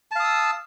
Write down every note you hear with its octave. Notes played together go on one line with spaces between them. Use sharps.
F5 A5 D#6 E6